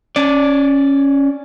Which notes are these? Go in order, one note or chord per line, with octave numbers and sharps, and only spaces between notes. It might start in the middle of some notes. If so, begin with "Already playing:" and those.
C#4 D5